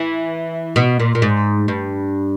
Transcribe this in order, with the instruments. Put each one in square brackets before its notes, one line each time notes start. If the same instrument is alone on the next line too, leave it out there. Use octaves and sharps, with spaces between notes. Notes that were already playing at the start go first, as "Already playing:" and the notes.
Already playing: [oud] E3
B2
A#2
A#2
G#2
G2